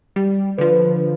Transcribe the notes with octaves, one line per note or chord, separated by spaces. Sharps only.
G3
D3 F3 B4